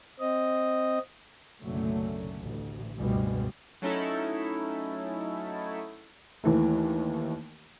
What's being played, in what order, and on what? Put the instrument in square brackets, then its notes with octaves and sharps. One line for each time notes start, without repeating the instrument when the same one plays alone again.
[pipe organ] C4 D#5
[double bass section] F#1 B1 D3 F#3 A3 C#4
A1 D2
F1 C#2 G2 B2 G3 G#3
[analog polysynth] F#3 A3 C#4 D#4 E4 A4
[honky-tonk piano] D#2 E3 A3